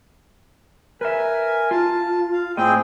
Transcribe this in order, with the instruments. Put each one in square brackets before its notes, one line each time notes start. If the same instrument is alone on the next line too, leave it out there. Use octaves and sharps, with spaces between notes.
[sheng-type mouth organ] A#4 G#5 [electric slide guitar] B4 E5
[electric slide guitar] F4 [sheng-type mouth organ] A5
[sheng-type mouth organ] F5
[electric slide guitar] A2 D#5 [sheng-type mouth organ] C4 G#4 G5